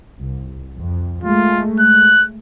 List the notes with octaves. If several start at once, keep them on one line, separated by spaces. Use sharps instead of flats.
C2
F2
G#3 A3 F4
F#6